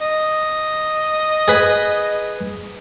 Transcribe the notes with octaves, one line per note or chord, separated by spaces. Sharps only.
D#5
G#4 B4